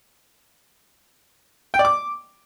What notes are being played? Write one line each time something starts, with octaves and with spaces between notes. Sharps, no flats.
G5
D5
D6